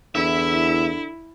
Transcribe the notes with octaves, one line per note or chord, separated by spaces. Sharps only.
E2 D3 E4 E5